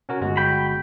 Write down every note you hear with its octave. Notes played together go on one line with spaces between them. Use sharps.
C#4 F#4 A#4
G1 G#3 F#4
G5 B5